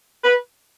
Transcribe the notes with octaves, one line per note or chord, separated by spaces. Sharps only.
B4